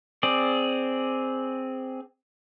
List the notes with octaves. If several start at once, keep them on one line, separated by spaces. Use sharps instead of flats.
C4 G#4 D5